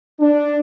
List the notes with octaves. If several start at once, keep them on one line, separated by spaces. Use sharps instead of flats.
D4